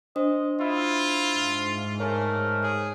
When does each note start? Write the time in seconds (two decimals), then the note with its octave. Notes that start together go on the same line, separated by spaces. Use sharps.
0.16 D4 C5 D#5
0.61 E4 F4
1.33 G#2
2.00 A3 A#4 C#5 G#5
2.63 G#4 C#5